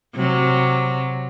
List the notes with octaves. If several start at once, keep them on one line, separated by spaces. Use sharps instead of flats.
C3 F#3